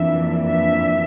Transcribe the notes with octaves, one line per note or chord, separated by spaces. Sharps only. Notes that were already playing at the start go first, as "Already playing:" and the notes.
Already playing: F2 E3 A#3 D4 E5
E5